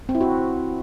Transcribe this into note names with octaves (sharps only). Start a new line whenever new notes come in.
C4
E4
F#4